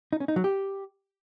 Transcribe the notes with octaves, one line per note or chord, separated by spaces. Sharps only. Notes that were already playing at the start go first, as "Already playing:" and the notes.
D#4
C#4
D#4
F#3
G4